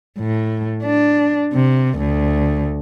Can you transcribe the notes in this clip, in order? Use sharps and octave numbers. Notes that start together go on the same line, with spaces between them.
A2
D4
C3
D2